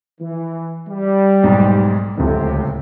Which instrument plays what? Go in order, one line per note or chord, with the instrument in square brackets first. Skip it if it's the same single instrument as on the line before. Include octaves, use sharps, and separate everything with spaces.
[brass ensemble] E3
G3
[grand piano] B1 G#2
[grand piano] D1 C#2 [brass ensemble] A2 C3